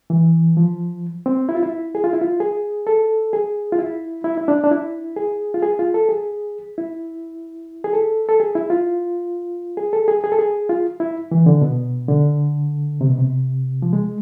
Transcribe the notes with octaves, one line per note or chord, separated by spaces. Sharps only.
E3
F3
C4
E4
F4
E4
G#4
F4
E4
F4
G#4
A4
G#4
F4
E4
E4
E4
D4
D4
E4
G#4
F4
G#4
F4
A4
G#4
E4
G#4
A4
A4
G#4
E4
F4
G#4
A4
G#4
G#4
A4
G#4
F4
E4
E3
D3
B2
D3
C3
B2
C3
F3
G#3